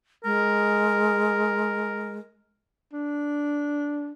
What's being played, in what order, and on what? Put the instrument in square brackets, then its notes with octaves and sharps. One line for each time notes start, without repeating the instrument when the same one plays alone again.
[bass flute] G#3 [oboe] A#4
[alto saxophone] D4